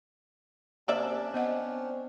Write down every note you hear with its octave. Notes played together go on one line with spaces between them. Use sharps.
C3 A#3 C#4 D4 D5 E5
B3 C4 D#5 F#5